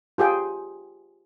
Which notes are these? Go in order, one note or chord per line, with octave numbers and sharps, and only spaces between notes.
F4 G4 G#4 G5